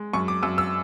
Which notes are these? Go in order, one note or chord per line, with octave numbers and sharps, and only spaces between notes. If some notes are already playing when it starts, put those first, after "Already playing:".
Already playing: G#3
F#2 C#6
D6
F#2 E6
E6